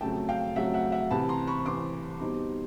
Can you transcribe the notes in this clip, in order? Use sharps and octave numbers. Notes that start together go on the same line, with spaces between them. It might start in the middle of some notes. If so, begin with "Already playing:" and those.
F2 C#3 F#3 A3 G5 A5
F5 G5
F2 C#3 F#3 A3 E5 F#5
E5 F#5
E5 F#5
C2 C3 E3 A5 B5
A#5 C6
B5 C#6
C2 C3 E3 C6 D6
B2 G3 C4 D#4